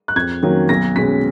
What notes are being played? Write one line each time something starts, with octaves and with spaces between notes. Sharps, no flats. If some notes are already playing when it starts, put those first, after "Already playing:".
F#6
F2 G#6
D#3 F#3 A#3 C#4
B1 A#6
B2 G#3 C#4 B6